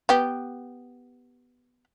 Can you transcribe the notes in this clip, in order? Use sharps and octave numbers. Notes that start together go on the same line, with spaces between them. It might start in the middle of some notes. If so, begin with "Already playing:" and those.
B3 G4